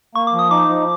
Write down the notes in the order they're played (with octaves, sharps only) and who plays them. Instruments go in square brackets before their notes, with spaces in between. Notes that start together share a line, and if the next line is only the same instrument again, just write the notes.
[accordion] A#3 [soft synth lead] C#6
[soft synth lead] D6
[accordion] F3
[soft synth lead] D#6
[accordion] D#4 [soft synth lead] D6
[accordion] F3